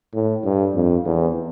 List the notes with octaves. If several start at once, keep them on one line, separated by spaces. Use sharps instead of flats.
A2
G2
F2
E2